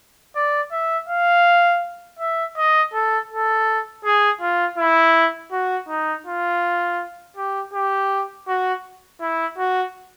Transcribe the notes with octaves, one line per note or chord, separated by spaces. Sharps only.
D5
E5
F5
E5
D#5
A4
A4
G#4
F4
E4
F#4
D#4
F4
G4
G4
F#4
E4
F#4